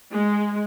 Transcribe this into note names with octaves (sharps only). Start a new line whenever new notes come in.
G#3